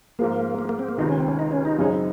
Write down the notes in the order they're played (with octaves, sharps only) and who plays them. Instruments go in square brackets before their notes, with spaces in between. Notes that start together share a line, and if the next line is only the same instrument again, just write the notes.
[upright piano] G#2 F3 G#3 [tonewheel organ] A#3
[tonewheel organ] A#3
A#3
C4
A#3
[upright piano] C#2 C3 D#3 [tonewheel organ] D#4
[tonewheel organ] C#4
C4
C#4
D#4
C#4
D#4
[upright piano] F#2 C#3 G#3 C4 D#4 [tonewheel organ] C#4